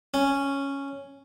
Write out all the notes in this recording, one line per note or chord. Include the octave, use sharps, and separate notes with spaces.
C#4